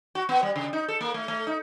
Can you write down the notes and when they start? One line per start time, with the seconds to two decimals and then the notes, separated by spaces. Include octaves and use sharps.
0.15 F#4
0.29 B3
0.43 G3
0.56 C#3
0.73 D#4
0.88 A4
1.01 A#3
1.14 A3
1.28 A3
1.47 D#4